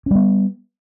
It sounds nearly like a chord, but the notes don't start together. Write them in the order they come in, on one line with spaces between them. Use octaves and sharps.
C#4 G3 B3